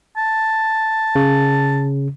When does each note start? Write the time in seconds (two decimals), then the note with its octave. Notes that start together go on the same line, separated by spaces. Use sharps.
0.17 A5
1.15 C#3